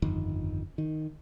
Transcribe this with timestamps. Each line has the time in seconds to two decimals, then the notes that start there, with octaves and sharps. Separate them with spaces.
0.02 G1 F2 D#3
0.78 D#3